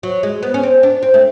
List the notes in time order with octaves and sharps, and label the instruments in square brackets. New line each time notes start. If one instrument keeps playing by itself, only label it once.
[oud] F#3
G#3
B3
C#4
C4
D4
C4
A3